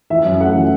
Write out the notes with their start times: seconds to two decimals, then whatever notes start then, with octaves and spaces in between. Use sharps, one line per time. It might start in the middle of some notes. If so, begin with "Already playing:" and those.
0.10 E3 E5
0.25 F#2
0.41 A3 F#5
0.56 E3